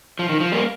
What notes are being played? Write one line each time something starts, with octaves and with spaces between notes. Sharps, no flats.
F3
D#3
F3
G3 A#3